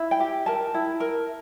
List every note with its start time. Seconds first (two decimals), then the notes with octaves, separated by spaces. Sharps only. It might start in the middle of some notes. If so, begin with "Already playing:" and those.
Already playing: E4
0.11 G5
0.20 G4
0.46 A#4 A5
0.74 E4
1.00 A#4